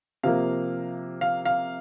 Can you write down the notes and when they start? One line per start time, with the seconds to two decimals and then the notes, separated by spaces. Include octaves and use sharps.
0.23 C3 F3 A#3 F5
1.21 F5
1.45 F5